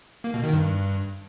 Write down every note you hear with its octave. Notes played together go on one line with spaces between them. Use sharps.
A#3
B2
D#3
G2